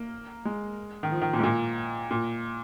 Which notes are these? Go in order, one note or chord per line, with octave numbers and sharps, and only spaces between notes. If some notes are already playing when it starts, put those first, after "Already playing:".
Already playing: A#3
G#3
D#3
F3
D#3
A#2
G#2
A#2
A#2